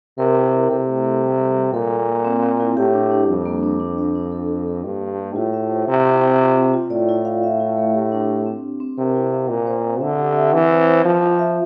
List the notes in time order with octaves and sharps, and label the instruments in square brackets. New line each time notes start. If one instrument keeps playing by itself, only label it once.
[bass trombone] C3 [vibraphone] A#4
[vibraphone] E4
E4
[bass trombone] C3 [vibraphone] A4
[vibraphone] A3
A4
G3
A4
G3
[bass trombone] A#2 [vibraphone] A4
[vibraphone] A#3
A#3
C4
C4
E4
[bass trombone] A2 [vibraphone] G4
[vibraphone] D4
D4
[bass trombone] F2 [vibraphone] G3
[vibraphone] A#3
D4
D4
D4
D4
A4
A4
A4
[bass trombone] G2 [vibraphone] A#3
[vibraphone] A#3
G4
[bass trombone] A2 [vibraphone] F4
[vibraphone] E5
C5
[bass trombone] C3 [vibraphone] E4
[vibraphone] C4
C4
F4
C4
F4
[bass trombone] A2 [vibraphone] D5
[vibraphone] E4
F5
E5
E4
A3
G4
D4
D4
C4
G4
C4
[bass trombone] C3 [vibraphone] A#4
[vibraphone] E4
F5
[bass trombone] A#2 [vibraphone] C5
[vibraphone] C5
C4
[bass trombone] D3 [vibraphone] E5
[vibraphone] G4
E5
[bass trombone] E3 [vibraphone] C4
[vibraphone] C5
C5
[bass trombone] F3 [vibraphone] F4
[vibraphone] F4
E5